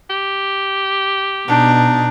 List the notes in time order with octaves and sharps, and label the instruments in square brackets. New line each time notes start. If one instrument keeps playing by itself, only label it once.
[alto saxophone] G4
[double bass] B2 [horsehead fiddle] D4 D#4